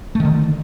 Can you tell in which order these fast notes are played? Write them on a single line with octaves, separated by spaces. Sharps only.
A3 D#3 D3